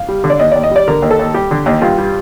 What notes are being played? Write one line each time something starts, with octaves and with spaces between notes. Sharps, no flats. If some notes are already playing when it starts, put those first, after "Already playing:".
Already playing: F5
G3
D3
D5
D#2 D#5
D#2 D5
D#5
G3 D5
D3 A#4
D#2
A4
D#2
G3 G4
D3
D#2
G2 F4
G3